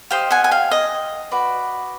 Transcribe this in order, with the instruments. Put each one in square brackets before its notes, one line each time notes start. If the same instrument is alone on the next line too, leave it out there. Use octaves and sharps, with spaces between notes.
[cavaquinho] G4 C5 D#5 F5 G5
F#5 G#5
G#5
F5 G5
D#5
F#4 B4 D5